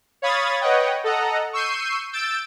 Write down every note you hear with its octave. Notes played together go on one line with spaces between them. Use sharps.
C#5 F5 B5 D#6 G#6 A6
B4 C#5 D#5 F#5 G5
A4 D#5 F#5 A#5
C#6 E6 G6 C7 D#7
E6 G6 A6 D7